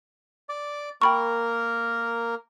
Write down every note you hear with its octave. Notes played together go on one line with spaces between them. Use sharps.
D5 D6
A#3 A#4 G5 B5 C#6